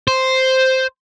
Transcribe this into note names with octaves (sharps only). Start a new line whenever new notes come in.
C5